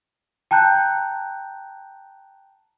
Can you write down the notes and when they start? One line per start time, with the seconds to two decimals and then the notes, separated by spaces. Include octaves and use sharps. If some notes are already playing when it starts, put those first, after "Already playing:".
0.51 G5 A5 A#5 F#6 G6